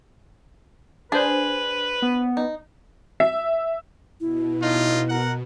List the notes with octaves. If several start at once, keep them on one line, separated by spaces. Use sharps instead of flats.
D4 G#4 B4 C5
B3
D#4
E5
B2 E4
A2 D#4 F4
A#4 F#5